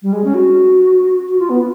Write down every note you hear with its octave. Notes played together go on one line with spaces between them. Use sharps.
G3
G#3
C#4
F#4
F#4
F4
B3